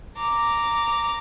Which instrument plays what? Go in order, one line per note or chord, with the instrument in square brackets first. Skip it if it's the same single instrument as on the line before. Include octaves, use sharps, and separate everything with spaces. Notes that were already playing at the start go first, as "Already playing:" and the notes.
[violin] A#5 D6